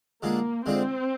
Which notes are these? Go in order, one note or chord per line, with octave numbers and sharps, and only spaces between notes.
D3 G#3 A#3 D4 F4 G#4
D3 G#3 C4 D4 F4 G#4